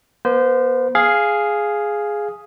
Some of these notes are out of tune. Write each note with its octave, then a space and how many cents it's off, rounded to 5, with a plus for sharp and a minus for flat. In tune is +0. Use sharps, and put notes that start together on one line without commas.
B3 -45 C5 -25
G#4 +0 F5 +0